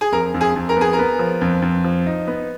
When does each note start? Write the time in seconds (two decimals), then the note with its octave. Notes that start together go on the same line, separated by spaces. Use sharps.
0.01 G#4
0.12 F2 A#4
0.34 F2
0.41 G#4
0.56 F2
0.69 A#4
0.76 B3 G#4
0.93 A#4
0.99 B3
1.19 F3
1.41 F2
1.62 F2
1.84 F3
2.06 D#4
2.27 B3